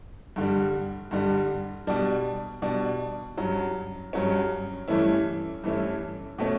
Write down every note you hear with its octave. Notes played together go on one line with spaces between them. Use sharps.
G2 D3 G3
G2 D3 G3
B2 G3 D4
B2 G3 D4
G2 F#3 C#4
G2 F#3 C#4
G2 E3 A3 C#4 E4
G2 E3 A3 C#4 E4
B2 A3 C#4